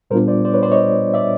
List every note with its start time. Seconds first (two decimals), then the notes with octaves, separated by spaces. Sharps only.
0.10 A#2 G3 B3 D4 F4 A#4 C5
0.27 C5 D5
0.45 C5 D5
0.53 B4 C#5
0.63 C5 D5
0.72 C#5 D#5
1.14 D5 E5